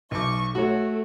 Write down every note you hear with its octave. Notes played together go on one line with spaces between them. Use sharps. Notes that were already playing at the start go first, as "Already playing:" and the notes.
B1 C#6 D6
A3 F#4 C#5